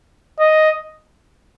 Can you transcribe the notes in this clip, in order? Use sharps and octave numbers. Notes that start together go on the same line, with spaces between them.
D#5